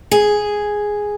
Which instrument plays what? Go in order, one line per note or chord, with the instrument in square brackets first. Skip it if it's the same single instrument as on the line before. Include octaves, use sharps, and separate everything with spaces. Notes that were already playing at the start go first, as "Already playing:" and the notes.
[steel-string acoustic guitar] G#4